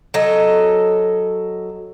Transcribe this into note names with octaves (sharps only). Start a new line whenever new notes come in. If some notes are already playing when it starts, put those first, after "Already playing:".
F#3 A4 D#5